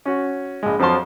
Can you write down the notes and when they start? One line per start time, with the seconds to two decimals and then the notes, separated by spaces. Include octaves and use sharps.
0.05 C#4 F#4
0.63 A#1 G#3
0.79 F2 F3 F#3 A5 C6